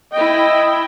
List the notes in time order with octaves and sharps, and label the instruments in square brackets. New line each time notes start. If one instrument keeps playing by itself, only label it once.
[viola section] E4 G5 [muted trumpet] D#5